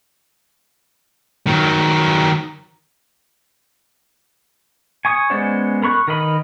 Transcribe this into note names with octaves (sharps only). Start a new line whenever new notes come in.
D#3 F#3
G#5 C#6 D#6
G#3 B3 C#4 C5 D5
A#4 B5 C#6 F#6
D#3 A#4 B4 D#5 B5